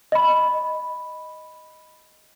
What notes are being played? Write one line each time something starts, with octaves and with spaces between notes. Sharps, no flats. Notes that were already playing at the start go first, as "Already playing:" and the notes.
D#5 B5